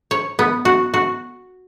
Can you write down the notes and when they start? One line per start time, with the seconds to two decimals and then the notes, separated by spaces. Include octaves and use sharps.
0.11 C#5
0.39 B3
0.65 F#4
0.94 F#4